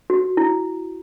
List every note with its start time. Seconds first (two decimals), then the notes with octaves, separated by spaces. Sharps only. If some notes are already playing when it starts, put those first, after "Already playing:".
0.10 F#4
0.37 E4